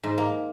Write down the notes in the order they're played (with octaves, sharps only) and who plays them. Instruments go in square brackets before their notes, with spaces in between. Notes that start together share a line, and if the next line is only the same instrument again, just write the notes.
[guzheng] G#2
A#3